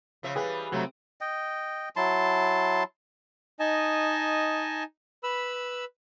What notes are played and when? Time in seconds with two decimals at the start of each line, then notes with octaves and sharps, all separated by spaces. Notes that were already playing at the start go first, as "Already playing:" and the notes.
0.23 C#3 F3 E5
0.36 E3 G3 G#4 B4
0.72 C3 F#3 A3 C4
1.21 D#5 G5
1.96 F#3 E4 A5 C6
3.60 D#4 D#5 G#5 A5
5.23 B4 B5 E6